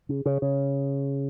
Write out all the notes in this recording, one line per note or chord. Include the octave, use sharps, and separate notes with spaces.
C#3
C#3
C#3